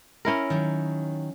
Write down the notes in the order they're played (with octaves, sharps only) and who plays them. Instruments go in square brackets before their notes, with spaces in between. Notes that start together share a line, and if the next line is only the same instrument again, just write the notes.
[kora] C#4 E4 A#4
[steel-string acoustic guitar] D#3 F#3